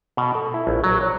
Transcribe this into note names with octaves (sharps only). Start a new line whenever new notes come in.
B2
A4
E4
A#1
F#3
C#5